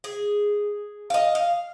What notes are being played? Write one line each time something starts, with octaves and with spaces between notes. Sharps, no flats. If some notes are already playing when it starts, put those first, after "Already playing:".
G#4
D#5 F5
F5